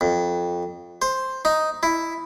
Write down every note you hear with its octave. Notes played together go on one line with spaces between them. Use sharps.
F2
C5
D#4
E4